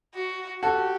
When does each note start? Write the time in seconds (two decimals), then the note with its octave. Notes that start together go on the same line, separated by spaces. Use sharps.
0.14 F#4
0.62 F#4 G4 A4